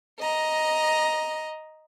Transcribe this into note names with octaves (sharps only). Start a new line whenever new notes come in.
D#5 A#5